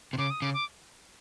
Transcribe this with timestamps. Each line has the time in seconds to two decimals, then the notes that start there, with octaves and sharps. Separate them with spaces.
0.13 C3
0.18 C#3 D6
0.30 D#6
0.42 C#3 D6
0.54 D6